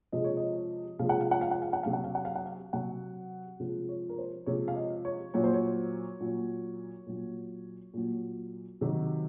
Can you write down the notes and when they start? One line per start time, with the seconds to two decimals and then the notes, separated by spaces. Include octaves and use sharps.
0.12 C3 F3 G#3 D#5
0.24 C#5
0.37 D#5
0.99 C3 F3 G#3 F5
1.09 F#5
1.21 F5
1.31 F#5
1.41 F5
1.51 F#5
1.62 F5
1.73 F#5
1.83 C3 F#3 F5
1.93 F#5
2.04 F5
2.15 F#5
2.25 F5
2.35 F#5
2.46 F5
2.73 C3 F#3 F#5
3.60 C3 F3 G#3
3.89 C#5
4.09 A#4
4.18 C5
4.46 C3 F3 G#3 C#5
4.68 F5
4.76 D#5
5.05 C#5
5.34 A#2 F#3 C#5
5.44 C5
5.53 C#5
6.20 A#2 F#3
7.07 A#2 F#3
7.94 A#2 F#3
8.81 C3 D#3 F#3